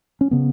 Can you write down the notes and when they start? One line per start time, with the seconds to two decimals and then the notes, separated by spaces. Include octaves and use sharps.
0.21 C#4
0.31 C#3 B3